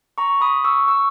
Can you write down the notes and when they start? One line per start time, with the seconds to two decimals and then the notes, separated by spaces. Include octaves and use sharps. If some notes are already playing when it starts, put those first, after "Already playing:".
0.18 A#5 C#6
0.41 B5 D#6
0.64 C#6 E6
0.87 C#6 E6